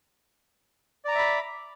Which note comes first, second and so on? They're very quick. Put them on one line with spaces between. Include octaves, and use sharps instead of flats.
D5 A#5 D6 E5 B5